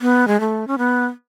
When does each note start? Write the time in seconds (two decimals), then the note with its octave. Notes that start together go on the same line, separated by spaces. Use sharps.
0.01 B3
0.28 G#3
0.40 A3
0.68 C#4
0.78 B3